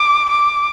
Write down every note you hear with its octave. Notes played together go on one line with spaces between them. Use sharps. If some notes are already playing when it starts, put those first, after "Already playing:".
Already playing: D6
D6